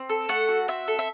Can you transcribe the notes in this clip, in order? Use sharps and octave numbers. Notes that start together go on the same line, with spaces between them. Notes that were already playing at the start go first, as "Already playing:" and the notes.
Already playing: C4
A4
A3 F#5
F#4
C4 E5
A4
E5